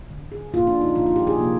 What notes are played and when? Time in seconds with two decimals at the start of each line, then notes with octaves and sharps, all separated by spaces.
0.11 D3 G#3
0.32 G#4
0.54 A#2 F3 A#3 F4
0.67 D4
0.81 D#4
0.95 A#2 F3 A#3 F4
1.06 F4
1.16 G4
1.27 G#4
1.38 C3 F3 A#3